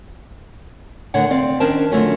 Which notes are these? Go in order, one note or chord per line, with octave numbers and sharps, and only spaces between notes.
D2 D3 D#3 C#5 F#5
C4 D5 F5
D#3 C#4 D4 A#4 C5 A5
D3 F3 F#3 A3 C#4